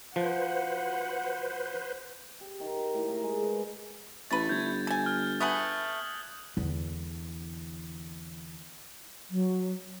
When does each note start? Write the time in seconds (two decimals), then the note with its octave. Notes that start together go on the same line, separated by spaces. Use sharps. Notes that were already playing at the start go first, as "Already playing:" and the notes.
0.16 F3 F#4 B4 C5 F#5
2.41 G4
2.60 D#3
2.79 A#4
2.94 A2
3.09 A#4
3.23 G#3
3.43 B4
4.31 A1 A3 B4 A6
4.49 G1 G6 G#6
4.87 A4 G#5
5.06 F6
5.40 A3 B3 G#4 D#6 F#6 F#7
6.57 E2 D3
9.30 F#3